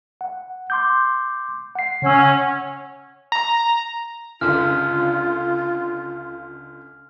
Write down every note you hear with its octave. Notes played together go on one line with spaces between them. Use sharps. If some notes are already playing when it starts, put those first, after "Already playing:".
F#5
C6 D6 G6
F#5 C7
C#3 C#4 E6
F#5
A#5
C#2 D3 F4 F6